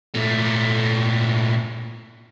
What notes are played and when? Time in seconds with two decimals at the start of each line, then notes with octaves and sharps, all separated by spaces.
0.15 A#2 A3